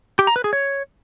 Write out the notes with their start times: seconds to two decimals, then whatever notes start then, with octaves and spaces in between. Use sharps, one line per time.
0.19 G4
0.27 A#5
0.36 B4
0.44 G#4
0.53 C#5